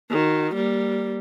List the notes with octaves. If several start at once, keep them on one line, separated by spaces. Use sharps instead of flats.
D#3 F#4
G3 A#3